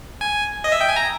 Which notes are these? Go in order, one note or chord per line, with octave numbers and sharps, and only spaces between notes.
G#5
D#5
E5
G5
G#5
A#5